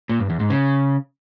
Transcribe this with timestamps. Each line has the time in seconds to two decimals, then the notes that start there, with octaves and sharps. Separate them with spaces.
0.09 A#2
0.20 G2
0.30 E2
0.40 G#2
0.50 C#3